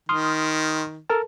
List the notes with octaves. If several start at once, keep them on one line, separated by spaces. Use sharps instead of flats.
D#3 C6 D#6 F6
A4 A#4 A5